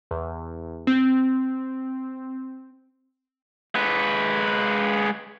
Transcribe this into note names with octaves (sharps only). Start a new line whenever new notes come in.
E2
C4
G#3 B4